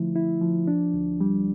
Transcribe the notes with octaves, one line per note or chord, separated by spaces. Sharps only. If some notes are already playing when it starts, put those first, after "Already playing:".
Already playing: D3 F3 A3 E4
E4
F3
D4
D2
G3